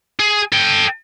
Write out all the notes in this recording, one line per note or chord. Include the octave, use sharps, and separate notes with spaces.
G#4
A4 G5